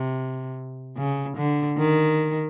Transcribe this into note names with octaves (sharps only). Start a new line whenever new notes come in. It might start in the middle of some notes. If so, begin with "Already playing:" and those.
Already playing: C3
C#3
D3
D#3